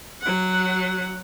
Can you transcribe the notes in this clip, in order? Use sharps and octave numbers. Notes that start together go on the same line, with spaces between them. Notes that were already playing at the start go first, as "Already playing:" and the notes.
F#3 F#5